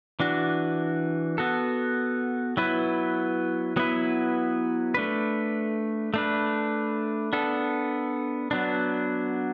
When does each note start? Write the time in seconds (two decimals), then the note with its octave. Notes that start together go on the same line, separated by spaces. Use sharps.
0.20 E3 D4 F#4
1.38 B3 F#4 A4
2.57 F#3 B3 E4 B4
3.76 F#3 B3 E4 B4
4.94 A3 D4 B4
6.14 A3 D4 B4
7.33 B3 D4 A4
8.51 F#3 B3 D4